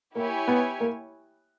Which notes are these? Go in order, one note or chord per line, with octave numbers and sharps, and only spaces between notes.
A#3 E4 G4 C#5 G#5
B3
A#3